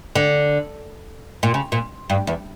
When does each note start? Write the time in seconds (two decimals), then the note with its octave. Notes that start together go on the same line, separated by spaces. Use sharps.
0.15 D3
1.43 A#2
1.54 C#3
1.72 A#2
2.10 G2
2.27 E2